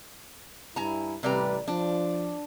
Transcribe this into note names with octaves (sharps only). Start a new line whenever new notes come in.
G2 E4 G#5 A#5
A1 C3 G3 B4 D5 A#5
F3 D4